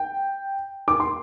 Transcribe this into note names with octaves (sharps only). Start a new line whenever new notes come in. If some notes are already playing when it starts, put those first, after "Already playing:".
Already playing: G5
D6
C6